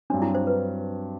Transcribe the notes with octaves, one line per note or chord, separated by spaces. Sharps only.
G2 F#3 C4 D4
E4
C5
B4